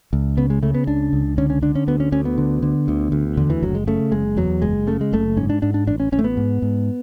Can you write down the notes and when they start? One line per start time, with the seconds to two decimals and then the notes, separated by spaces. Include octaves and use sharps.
0.13 C#2
0.37 C#3 B3
0.50 G#3
0.62 C#3 A3
0.74 B3
0.87 C#2 D4
1.13 C#2
1.38 D3 C#4
1.50 C#4
1.62 D3 D4
1.75 C#4
1.88 D2 B3
2.00 C#4
2.12 D2 C#4
2.25 B3
2.38 D3
2.62 D3
2.88 D2
3.12 D2
3.37 E2 D3
3.50 E3
3.62 F#1 F#3
3.75 G#3
3.87 C#3 A3
4.12 F#1 G#3
4.37 E2 F#3
4.62 F#1 G#3
4.87 C#3 A3
5.01 G#3
5.13 F#1 A3
5.37 G#2 C#4
5.50 D4
5.62 G#2 D4
5.74 D4
5.87 A1 D4
6.00 C#4
6.12 A1 C#4
6.19 A3
6.24 B3
6.37 G#2
6.62 G#2